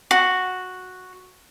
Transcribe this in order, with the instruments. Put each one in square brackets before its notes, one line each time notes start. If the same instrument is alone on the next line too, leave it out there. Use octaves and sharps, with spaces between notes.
[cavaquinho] F#4